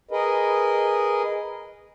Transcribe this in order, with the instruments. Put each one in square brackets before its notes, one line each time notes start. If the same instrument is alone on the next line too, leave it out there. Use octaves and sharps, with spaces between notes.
[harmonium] G#4 A#4 B4 D#5